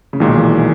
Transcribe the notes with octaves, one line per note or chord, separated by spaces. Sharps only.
C#3
B1 A#2 D#3 G#3
E3